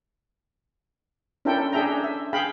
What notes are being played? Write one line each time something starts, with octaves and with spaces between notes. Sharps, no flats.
C#4 D4 E4 A4 A#4 G5
D4 G#4 A4 E5 G5 A#5
E5
G#4 F5 G5 B5